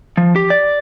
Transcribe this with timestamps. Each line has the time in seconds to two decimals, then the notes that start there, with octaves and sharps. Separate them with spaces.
0.17 F3
0.36 G4
0.50 D5